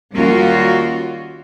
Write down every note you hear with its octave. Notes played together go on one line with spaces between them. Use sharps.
D#2 G3 C#4 F4 F#4 A#4